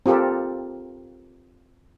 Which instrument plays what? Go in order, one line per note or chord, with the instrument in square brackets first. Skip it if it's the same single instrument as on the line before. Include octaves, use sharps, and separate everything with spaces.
[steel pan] C4 F4 G4 A4 A#4